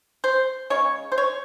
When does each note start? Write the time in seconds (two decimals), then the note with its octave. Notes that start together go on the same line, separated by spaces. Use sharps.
0.24 C5
0.70 C#3 G#3 C#4 C#5
1.12 C5
1.18 C#5